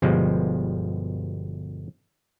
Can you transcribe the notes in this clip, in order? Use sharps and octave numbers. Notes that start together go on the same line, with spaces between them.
G1 B2 F3 G3 G#3